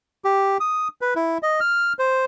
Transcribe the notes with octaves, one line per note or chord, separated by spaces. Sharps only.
G4
D#6
B4
E4
D#5
F6
C5